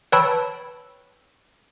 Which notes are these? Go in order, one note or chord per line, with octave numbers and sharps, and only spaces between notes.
B4 C#5 G5 A5 B5 E6